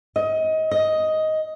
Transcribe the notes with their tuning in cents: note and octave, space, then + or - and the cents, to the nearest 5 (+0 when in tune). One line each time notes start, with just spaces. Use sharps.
D#5 +25
D#5 +10